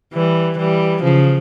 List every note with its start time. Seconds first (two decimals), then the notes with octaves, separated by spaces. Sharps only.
0.14 E3 G3
0.58 E3 G3
1.03 C#3 F3